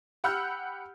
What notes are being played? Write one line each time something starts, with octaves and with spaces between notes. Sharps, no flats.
G4 F#5 B5 E6 F6 G6